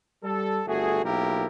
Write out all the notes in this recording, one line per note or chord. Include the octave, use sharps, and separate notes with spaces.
G3 A4
G1 A3 F#4 G#4
B1 A#3 E4 G4 A#4